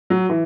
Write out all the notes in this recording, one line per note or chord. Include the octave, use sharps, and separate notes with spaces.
F#3
E3